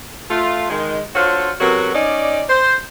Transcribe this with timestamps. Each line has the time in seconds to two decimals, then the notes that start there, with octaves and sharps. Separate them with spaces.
0.30 A3 F4
0.70 D#3 G#3
1.16 D4 F4 F#4 A4 C5 C#5
1.60 C3 F#3 B3 F#4 A4 A#4
1.95 C#4 D#4 D5
2.49 C5